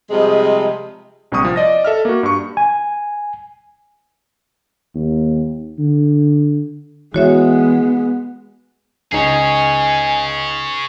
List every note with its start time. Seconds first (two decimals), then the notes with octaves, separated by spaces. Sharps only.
0.10 C3 F3 G3 G#3 G#4 D#5
1.32 A#1 C3 G3 C#6 D#6
1.45 F3
1.56 D5 D#5 A#6
1.84 A4 E5 F6
2.05 A#3 F#4
2.23 G2 C#6
2.57 G#5
4.95 D#2
5.79 D3
7.14 E3 G#3 B3 F#4 C#5 E5
9.12 C#2 D#4 G#4 C#5 G#5